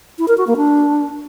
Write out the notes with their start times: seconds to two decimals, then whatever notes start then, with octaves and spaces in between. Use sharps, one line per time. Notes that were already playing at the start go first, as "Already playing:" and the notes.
0.19 E4
0.28 A#4
0.38 F#4
0.47 A#3
0.57 D4